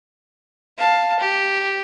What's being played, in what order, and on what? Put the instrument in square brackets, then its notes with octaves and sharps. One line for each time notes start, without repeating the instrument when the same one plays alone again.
[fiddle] F5 A5
G4